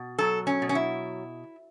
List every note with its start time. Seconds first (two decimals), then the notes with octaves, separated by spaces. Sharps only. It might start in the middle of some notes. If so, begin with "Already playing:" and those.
Already playing: B2
0.19 F#3 A4
0.47 C#4
0.62 B2
0.69 C#4
0.75 E4